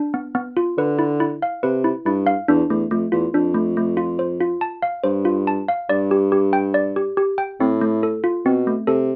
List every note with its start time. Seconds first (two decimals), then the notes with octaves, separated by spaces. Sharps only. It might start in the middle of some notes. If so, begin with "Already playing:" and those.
Already playing: D4
0.14 B3
0.35 B3
0.57 F4
0.78 D3 B4
0.99 E4
1.20 E4
1.42 F5
1.63 C3 B4
1.84 E4
2.05 G2 E4
2.26 F5
2.48 E2 D4
2.70 E2 A3
2.91 F2 A3
3.12 E2 F4
3.34 F2 D4
3.54 A3
3.77 A3
3.97 F4
4.19 C5
4.40 F4
4.61 A5
4.82 F5
5.04 G2 C5
5.25 F4
5.47 A5
5.68 F5
5.89 G2 D5
6.11 G4
6.32 G4
6.53 G5
6.74 D5
6.96 G4
7.17 G4
7.38 G5
7.60 A2 C4
7.81 A3
8.03 A4
8.24 F4
8.45 B2 C4
8.67 A3
8.87 C3 A4